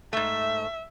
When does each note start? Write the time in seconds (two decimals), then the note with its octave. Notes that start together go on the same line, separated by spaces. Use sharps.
0.13 G#2 A3 E5